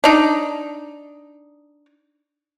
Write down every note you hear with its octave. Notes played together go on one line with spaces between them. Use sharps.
D4 D#4